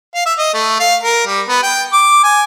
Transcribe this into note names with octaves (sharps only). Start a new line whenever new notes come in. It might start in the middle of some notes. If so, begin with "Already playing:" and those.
F5
E5
D#5
A3
F5
A#4
G3
B3
G5
D6
G#5